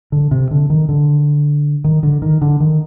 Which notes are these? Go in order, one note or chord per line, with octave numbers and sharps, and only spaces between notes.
D3
C3
D3
D#3
D3
D#3
D3
D#3
D3
D#3